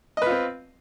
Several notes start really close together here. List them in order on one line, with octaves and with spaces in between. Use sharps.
D#5 B4 F4 C4